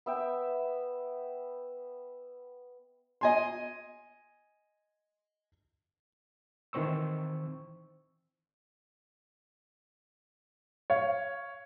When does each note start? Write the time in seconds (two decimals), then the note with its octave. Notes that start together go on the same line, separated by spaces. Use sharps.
0.06 B3 E5 G5
3.21 D#5 G#5 C6
6.73 D#3 E3 C4 C5 C#6 E6
10.90 C#5 F5